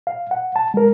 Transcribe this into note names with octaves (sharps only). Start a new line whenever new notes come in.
F5
F#5
A5
G#3 A#4